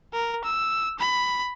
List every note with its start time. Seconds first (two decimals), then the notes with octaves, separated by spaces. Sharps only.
0.13 A#4
0.45 E6
1.00 B5